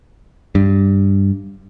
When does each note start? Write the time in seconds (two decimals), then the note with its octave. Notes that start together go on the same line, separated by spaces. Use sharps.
0.55 G2